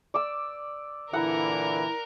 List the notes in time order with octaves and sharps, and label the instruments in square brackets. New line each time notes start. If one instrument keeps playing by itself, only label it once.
[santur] D5 E6
[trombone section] A#2 D3 E3 [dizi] E4 [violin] A#4 [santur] F#5 A#5